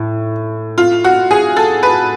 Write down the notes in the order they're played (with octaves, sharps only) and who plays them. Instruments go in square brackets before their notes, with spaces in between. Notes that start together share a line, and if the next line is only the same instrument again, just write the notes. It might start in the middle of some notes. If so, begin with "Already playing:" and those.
Already playing: [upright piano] A2
[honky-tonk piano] F4
F#4
G#4
A4
B4